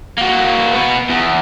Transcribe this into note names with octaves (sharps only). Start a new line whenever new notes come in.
A#3 F#4
B2 B3
E2